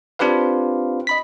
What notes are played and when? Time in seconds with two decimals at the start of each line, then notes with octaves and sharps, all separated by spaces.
0.19 C4 D4 F4 G4 B4 F5
1.07 D#5 B5 B6